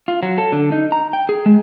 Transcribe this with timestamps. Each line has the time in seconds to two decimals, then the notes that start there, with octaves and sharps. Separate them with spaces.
0.08 F4
0.23 F#3
0.38 A4
0.52 D3
0.72 D#4
0.92 A#5
1.13 G5
1.29 G#4
1.46 G#3